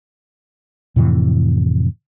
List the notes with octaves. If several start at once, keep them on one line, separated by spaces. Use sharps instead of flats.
F2 A2 C3 E3